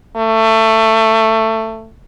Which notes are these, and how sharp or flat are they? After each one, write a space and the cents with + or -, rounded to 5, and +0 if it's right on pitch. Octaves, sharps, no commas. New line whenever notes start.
A3 +20